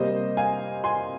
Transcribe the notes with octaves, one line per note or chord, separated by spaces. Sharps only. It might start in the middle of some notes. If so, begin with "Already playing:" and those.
Already playing: C3 G3 A#3 C5 D#5
F5 G#5
G#5 C6